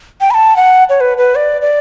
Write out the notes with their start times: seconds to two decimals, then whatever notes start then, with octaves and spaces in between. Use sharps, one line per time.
0.21 G5
0.31 B5
0.34 A5
0.56 F#5
0.89 C#5
1.01 B4
1.18 B4
1.35 D5
1.62 D5